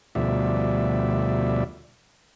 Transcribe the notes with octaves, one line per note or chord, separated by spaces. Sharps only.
D2 B2 F3 G3 D5 E5